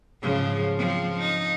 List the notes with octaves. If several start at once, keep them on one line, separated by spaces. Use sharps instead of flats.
G#2 C#3 F3
F3 C4
D#4